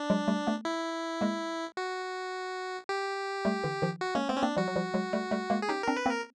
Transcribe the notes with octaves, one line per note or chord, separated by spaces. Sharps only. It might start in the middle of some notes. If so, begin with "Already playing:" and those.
Already playing: D4
F#3 G#3
G3 A3
A3 B3
E4
G#3 A#3
F#4
G4
G3 A3
D3 E3
D#3 F3
F#4
G#3 A#3 C#4
A3 B3 C4
C#4
A#3 C4 D4
F3 G3 F#4
F#3
F3 G3
F#3 G#3
G3 A3
G3 A3
G#3 A#3
G#4
C#4 D#4 G4
C4 D4 A#4
B4
A#3 C4
A#4